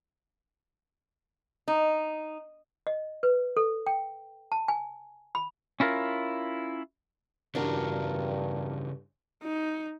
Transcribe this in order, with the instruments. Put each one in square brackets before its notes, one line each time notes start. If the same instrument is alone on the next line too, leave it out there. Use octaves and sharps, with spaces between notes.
[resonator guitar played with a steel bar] D#4
[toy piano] D#5
B4
A4
G5
A5
G#5
B5
[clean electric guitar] C#4 E4 F4 A#4
[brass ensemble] G2 [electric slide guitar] C#3 E3 F4 [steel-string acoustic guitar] D4 F#4 A#4
[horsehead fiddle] D#4